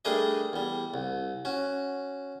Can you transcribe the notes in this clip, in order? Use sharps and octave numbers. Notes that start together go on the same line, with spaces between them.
G3 A3 D4 G#4 A#4 D#5
E2 G3
C2
C#4 F#4